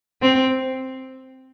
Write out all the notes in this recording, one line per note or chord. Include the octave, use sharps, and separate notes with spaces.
C4